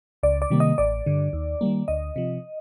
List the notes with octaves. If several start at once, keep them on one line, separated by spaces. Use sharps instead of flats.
C#2 D5
D5
C3 D#3 G3 A#3
D#5
A1 D5
G2 D3
D#2
D#3 G3 A#3
D2 D#5
C3 F3